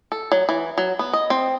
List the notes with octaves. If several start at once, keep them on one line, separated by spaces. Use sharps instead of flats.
A4
F#3
E3
F#3
B3
D#5
C4